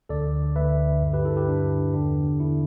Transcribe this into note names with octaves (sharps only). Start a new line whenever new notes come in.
D2 D3 A4 D5
D2 D3 B4 E5
G2 D3
G4 B4
E4 A4
G4 B4
G2 D3 D4
E2 D3 D4
E2 D3 E4